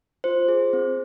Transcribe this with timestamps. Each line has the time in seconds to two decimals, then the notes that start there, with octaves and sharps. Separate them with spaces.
0.24 F4 C5
0.48 G#4
0.73 C4